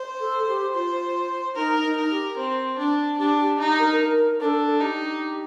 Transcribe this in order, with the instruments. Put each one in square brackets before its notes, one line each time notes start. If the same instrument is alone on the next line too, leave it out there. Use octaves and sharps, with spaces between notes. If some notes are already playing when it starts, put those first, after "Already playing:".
Already playing: [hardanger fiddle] C5
[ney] A4
G4
[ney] F4 [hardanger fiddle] C5
[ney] D#4 [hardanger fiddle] A#4
[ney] D#4
[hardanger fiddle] A#4
[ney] G4
[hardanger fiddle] C4
D4
[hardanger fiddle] D4 [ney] G4
[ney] G4
[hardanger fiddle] D#4 [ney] G4
[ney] A#4
A#4
[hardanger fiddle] D4 [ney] A4 A#4
[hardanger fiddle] D#4 [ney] G4